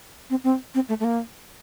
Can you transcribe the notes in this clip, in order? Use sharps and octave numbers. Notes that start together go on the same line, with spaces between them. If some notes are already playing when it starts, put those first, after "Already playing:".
C4
C4
C4
A3
A3
A#3